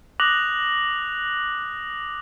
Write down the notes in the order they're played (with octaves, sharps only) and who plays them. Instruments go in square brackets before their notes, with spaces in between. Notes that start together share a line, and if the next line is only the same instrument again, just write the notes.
[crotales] D6 D#6 F#6 A#6 F7 F#7